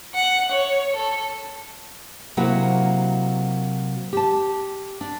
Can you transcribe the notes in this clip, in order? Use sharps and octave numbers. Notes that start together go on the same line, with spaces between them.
F#5
C#5
A4
C3 F#3 A#3 E4 F#4 A#4
G4 A5
D4